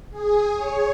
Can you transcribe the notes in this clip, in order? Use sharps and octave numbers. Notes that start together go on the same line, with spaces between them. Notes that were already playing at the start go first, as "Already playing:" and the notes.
G#4
C#5